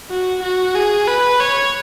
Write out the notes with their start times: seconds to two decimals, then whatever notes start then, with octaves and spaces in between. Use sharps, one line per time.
0.10 F#4
0.43 F#4
0.75 G#4
1.08 B4
1.40 C#5